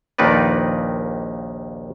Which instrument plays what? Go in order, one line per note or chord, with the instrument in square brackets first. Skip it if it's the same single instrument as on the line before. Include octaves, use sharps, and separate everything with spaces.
[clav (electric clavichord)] A#1 D#2 D#3 D#4 B4 D5